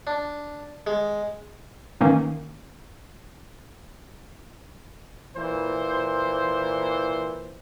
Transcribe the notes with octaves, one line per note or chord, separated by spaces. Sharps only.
D4
G#3
D#3 E3 A#3 C#4 D#4
A#2 E3 C5